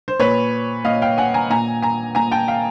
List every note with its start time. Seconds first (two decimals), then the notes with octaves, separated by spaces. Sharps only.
0.08 C5
0.20 A#2 B4 C#5
0.85 A#2 D#5 F5
1.02 F5 G5
1.18 F#5 G#5
1.34 G#5 A#5
1.50 A#2 G#5 A#5
1.82 G#5 A#5
2.15 A#2 G#5 A#5
2.31 G5 A5
2.48 F5 G5